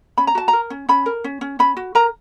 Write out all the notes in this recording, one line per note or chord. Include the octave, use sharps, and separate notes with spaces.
C#4 B5
A#5
F#4 A5
A#5
A#4
C#4
C#4 B5
A#4
C#4
C#4
C#4 B5
F#4
A#4 A#5